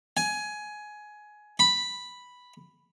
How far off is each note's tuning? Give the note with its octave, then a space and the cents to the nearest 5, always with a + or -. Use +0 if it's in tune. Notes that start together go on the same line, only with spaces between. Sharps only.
G#5 +15
B5 +0